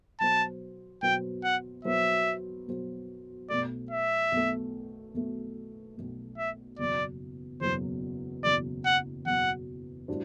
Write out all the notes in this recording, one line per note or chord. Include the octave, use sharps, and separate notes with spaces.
B2 F#3 B3 F#4 C5 A5
B2 F#3 B3 F#4 C5 G5
F#5
B2 F#3 B3 F#4 C5 E5
B2 F#3 B3 F#4 C5
B1 B2 A3 D5
E5
B1 B2 A3
B1 B2 A3
B1 B2 A3
E5
F#1 E2 B2 F#3 D5
F#1 E2 B2 F#3 C5
F#1 E2 B2 F#3 D5
F#5
F#1 E2 B2 F#3 F#5
A2 G3 D4 F#4 C5